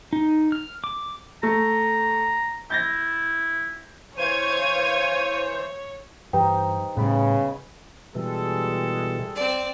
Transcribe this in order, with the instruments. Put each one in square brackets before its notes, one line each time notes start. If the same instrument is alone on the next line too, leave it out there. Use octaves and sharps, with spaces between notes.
[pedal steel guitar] D#4
F6
D6
[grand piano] A3 [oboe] A#5
[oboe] E4 [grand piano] G6 A6 A#6
[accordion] E3 C5 [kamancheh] C#5 [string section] F5 C#6 G#6 [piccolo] D#7
[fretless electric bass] G2 E3 [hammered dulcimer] D#4 C5 [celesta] G4 B4 G5
[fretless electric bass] A2 G3 [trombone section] C#3 [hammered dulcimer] B3 B5
[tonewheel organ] B2 E3 [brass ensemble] G3 G#3 A4
[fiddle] C4 D5